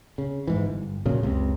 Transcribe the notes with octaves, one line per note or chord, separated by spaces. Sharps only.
C#3
G#2 E3
G1
A#2 C#3 F#3
F#1 C#2 C3